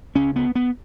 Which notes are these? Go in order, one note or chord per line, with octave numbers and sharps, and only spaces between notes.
C#2 C#3 C#4
B3
B3